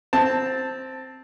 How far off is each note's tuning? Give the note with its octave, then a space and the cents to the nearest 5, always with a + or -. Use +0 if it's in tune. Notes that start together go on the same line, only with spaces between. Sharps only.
C4 +0 A5 +5